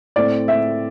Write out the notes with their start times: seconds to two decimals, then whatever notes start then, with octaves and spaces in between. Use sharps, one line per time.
0.16 A2 A3 C4 D5
0.48 E5